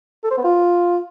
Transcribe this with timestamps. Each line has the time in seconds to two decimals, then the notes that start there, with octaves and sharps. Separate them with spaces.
0.24 A4
0.31 C5
0.37 B3
0.44 F4